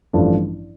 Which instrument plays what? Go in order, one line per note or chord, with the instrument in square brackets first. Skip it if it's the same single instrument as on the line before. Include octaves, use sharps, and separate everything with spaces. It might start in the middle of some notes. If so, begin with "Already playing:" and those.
[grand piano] A1 G2 F3 A3 D4